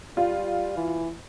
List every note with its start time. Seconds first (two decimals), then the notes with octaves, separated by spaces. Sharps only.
0.17 G3 F4
0.76 E3